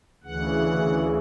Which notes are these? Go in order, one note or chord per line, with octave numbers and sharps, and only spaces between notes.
D2 C#3 E3 F#5